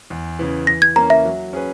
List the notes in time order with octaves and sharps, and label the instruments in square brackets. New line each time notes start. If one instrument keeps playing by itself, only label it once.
[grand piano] E2
C#3 E3
[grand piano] E3 [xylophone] A#6
[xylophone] G#6
[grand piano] A#3 C#4 [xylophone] A#5
[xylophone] E5
[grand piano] F#3
C#4 G#4 B4